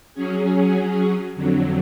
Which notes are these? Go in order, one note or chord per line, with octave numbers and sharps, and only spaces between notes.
F#3 C#4 G#4
F2 D3 F#3